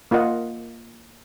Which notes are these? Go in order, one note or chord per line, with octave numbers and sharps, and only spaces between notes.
A#3 F4 A#4 D#5 F#5